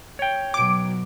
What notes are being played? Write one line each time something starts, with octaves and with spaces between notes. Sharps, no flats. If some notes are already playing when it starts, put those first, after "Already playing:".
C#5 G5
B2 F#3 D6 D7